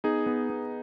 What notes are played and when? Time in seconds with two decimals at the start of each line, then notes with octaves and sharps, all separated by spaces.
0.04 B3 D#4 G#4
0.26 B3
0.50 B3